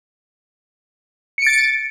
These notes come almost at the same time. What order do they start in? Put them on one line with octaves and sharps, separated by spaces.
C#7 D7 A6